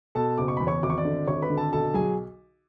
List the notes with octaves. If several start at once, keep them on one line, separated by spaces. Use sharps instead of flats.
B2 A4 A5
F#1 D6
C#6
E2 B5
C#5 C#6
G#1 D6
C#6
D5 D6
D3
G#1 C#5 C#6
B4 B5
D3
A4 A5
B1 A4 A5
F#3 G#4 G#5